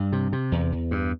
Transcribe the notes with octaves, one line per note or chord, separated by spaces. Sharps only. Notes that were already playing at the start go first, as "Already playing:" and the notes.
Already playing: G2 G3
C3
C3
E2
E2
G2